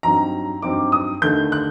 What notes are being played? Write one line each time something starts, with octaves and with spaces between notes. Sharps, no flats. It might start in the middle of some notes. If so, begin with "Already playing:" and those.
G2 F#3 C4 D#4 A#5
G2 F#3 C4 D#4 D6
D#6
D#2 D3 A3 D#4 G6
F#6